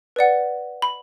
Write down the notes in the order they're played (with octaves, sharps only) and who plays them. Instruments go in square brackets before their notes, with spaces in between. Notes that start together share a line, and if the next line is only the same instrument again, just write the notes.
[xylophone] B4 D5 F#5
B5